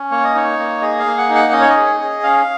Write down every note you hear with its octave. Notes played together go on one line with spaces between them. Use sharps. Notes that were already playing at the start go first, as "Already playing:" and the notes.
Already playing: C#4
A#3 C#5
D#5
D#4 C#5
A#3
G#4 D#5
F5
A#3
F#5
D#4
F#5
C#4 D#5
C#5
D#5
G#4
G#4
C#4 F5